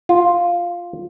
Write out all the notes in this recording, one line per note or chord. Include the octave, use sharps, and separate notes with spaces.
F4